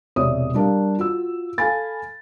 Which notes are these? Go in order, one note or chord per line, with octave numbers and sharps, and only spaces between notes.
E1 C3 C#5 D5 E5 D#6
G3 D4 A#4 F5
F4 F#4 E6
A4 F5 G#5 B5 A6